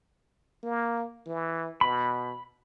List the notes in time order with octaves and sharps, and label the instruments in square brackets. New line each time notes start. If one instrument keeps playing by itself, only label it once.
[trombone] A#3
E3
[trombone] B2 [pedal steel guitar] B5